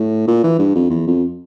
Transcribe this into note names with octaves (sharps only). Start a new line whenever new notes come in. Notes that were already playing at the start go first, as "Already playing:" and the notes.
Already playing: A2
A#2
E3
G2
F2
E2
F2